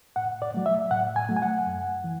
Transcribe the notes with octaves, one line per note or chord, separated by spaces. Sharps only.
A2 F#5
D5
F#3 A3
E5
A2 F#5
G#5
F#3 A3
G#5
F#5
F#2
E3